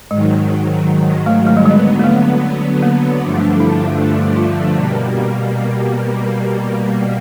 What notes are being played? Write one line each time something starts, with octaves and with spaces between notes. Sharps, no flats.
G#2 D#3 F#3 G#3
A3
A3
G3
D3 F#3 G#3 B3
A#3
A3
A#3
G2 D3 F3 A3 D4
E4
F4
B2 G3 A#3